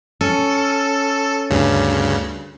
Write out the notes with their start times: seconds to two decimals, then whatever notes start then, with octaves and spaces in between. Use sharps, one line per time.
0.21 C#4 A4
1.50 D2 G2 C#3